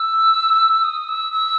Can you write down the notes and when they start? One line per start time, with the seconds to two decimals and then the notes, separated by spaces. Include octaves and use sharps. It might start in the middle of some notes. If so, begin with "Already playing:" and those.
Already playing: E6
0.84 D#6
1.09 E6
1.33 E6